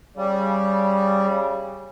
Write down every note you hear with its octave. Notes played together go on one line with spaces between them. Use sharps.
C#3 G3